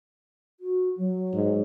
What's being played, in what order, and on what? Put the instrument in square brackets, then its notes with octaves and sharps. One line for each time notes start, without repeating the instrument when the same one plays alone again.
[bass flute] F#4
F#3
[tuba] G#2